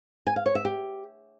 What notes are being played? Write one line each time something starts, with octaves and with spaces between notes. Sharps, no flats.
G#5
F5
C#5
E5
G4